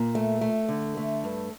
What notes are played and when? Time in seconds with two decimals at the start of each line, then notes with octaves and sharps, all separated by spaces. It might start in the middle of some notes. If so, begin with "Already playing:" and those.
Already playing: A#2
0.15 A3
0.41 A3
0.69 D3
0.97 A3
1.24 G2